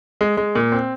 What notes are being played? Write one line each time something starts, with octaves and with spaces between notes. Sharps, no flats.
G#3
G#3
A#2
C4